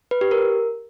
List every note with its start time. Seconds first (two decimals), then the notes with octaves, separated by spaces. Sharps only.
0.11 B4
0.21 G4
0.31 A#4